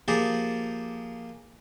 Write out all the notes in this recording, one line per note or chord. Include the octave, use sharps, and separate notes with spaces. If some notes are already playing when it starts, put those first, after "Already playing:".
F3 A#3 G4 G#4 D5